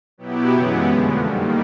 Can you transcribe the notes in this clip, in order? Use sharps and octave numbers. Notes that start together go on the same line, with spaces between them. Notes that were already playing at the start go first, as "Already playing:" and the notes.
B2 F#3 B3 E4 G4
F#2 C#3 E3 G#3 B3
F2 D3 F3 A3
D#3 G3 A#3